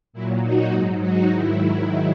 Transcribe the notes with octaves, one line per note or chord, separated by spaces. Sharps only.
A#2 F#3 E4
D#4 F#4
G#2 F#3
D#4 F#4
G#2 D#3 F#3 E4